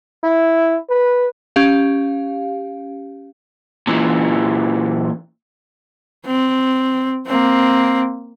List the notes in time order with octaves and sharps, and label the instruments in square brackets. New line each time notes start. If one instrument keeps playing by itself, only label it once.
[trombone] E4
B4
[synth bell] C#4 G4 F5
[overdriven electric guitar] A#2 E3
[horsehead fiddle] C4
A#3 C4